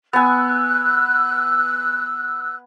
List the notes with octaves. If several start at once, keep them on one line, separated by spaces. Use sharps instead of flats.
B3 G#5 E6 F#6